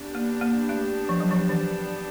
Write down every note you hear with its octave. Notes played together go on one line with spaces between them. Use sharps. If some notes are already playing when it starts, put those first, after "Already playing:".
Already playing: B3 D4 G4
A#3
A#3
A3
F3
F#3
F3
E3